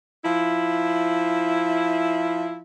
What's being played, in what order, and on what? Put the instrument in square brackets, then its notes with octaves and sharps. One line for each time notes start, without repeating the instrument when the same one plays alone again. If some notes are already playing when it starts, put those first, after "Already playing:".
[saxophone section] F3 E4